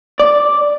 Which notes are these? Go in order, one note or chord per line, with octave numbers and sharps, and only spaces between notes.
D5